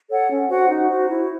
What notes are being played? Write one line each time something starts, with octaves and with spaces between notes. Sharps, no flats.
A4 C#5 F#5
C#4
F#4 C5 F#5
D#4
F#4 C5
E4